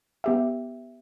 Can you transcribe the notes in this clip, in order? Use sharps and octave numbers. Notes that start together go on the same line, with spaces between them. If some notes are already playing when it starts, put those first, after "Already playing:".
B3 G4 E5